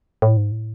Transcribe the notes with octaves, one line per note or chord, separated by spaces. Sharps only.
A2
G#2
A2